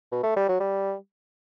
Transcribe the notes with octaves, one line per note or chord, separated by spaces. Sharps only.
B2
A3
G3
F#3
G3